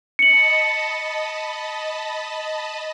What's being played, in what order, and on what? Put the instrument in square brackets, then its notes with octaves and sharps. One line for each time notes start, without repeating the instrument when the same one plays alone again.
[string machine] D#5 A5 B5 [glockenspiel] C#7 F#7